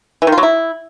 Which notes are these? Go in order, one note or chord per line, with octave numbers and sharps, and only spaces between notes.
E3
D#3
F4
F#3
E4